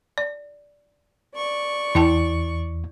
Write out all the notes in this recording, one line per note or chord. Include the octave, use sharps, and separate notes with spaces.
D5
D5 C#6
E2 E4 G5 A5